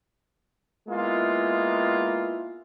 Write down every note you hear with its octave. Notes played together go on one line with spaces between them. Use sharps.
G#3 A#3 B3 E4 F4